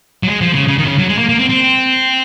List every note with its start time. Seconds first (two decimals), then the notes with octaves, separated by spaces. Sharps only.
0.23 F#3
0.28 G#3
0.41 F3
0.54 C#3
0.68 C#3
0.78 D#3
0.84 C3
0.88 C#3
0.98 F#3
1.09 G#3
1.19 A#3
1.29 A#3
1.39 C4
1.49 C4